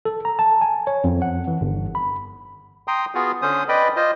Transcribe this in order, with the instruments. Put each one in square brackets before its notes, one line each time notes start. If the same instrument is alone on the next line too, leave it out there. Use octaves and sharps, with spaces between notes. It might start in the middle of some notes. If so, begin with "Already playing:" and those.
[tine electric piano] A4
A#5
A5
G#5
C#5
F2
F#5
E3
G1
B5
[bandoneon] G5 A#5 C6 D#6
B3 F4 F#4 G#4
D3 C#4 C5 D#6
B4 D5 D#5 G5 B5
F4 C5 D#5